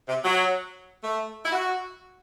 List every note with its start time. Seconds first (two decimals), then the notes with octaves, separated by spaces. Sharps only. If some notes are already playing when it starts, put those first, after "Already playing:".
0.08 C3
0.24 F#3
1.04 A3
1.45 E4
1.52 F#4